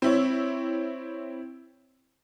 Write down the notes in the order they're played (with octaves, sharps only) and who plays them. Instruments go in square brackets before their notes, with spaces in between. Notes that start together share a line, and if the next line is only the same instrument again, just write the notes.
[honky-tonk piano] C4 E4 C#5